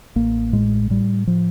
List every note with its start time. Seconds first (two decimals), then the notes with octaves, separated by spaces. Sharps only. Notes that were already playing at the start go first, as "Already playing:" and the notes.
0.16 A1 A#3
0.53 A2 G#3
0.90 A2 G3
1.27 A2 F3